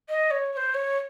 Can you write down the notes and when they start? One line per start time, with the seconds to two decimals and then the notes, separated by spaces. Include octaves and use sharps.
0.09 D#5
0.31 C#5
0.52 C#5
0.57 C5
0.74 C#5